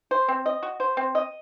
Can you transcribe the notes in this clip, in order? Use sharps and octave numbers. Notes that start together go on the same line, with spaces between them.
C5
C4
D#5
F#4
C5
C4
D#5